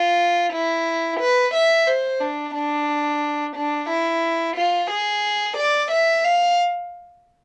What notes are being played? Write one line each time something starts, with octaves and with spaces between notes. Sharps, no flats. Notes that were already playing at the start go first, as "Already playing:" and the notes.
Already playing: F4
E4
B4
E5
C5
D4
D4
D4
E4
F4
G#4
D5
E5
F5